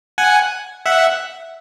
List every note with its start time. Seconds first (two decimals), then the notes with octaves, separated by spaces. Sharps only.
0.18 F#5 G#5
0.86 E5 F#5